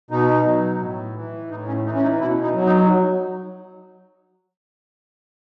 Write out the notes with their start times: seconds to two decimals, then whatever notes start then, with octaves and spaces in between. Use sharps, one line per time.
0.11 B2 D#4
0.46 F#3
0.80 A2
1.15 E3
1.50 A2 D#4
1.68 C#4
1.85 E3 D#4
1.95 C#4
2.02 D#4
2.20 B2 E4
2.42 D#4
2.54 F#3
2.65 D#4